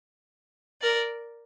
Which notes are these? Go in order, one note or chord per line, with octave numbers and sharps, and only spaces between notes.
A#4 D5